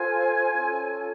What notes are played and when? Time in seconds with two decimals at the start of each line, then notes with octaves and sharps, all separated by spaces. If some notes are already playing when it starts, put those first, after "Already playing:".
Already playing: F4 A4 C5 G#5
0.54 C#4 F4 A4